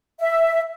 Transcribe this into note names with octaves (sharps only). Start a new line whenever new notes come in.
E5